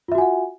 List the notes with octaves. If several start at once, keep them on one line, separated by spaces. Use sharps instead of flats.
F4 F#4 E5 F#5 G#5